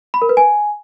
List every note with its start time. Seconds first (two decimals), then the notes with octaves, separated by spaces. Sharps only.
0.14 B5
0.22 A#4
0.29 B4
0.37 G#5